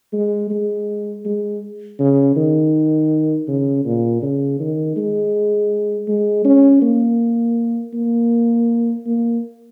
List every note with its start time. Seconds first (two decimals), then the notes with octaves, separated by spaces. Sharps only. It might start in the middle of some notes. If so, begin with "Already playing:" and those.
0.13 G#3
0.50 G#3
1.25 G#3
1.99 C#3
2.36 D#3
3.48 C#3
3.85 A#2
4.22 C#3
4.60 D#3
4.97 G#3
6.08 G#3
6.45 C#4
6.82 A#3
7.94 A#3
9.06 A#3